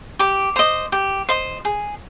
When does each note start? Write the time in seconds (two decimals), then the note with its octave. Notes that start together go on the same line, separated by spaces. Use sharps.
0.19 G4 D6
0.56 C5 D#5
0.92 G4
1.29 C5 D#5
1.65 G#4